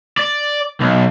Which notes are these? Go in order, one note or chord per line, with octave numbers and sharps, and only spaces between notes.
D5
B1